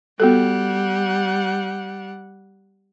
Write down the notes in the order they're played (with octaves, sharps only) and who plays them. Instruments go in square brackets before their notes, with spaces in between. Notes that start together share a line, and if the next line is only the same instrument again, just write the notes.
[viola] G3 F#5 [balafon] B3 F#4 A4